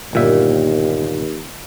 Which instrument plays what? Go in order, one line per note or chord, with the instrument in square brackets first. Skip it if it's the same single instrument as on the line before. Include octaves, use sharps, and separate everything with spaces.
[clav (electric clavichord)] G1 A#2 E5 [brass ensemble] D#2